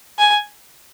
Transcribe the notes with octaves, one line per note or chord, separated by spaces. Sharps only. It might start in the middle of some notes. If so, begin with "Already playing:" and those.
G#5